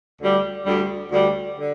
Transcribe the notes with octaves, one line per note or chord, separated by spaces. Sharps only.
D2 D3 G3
D2 D3 G3
D2 D3 G3
D3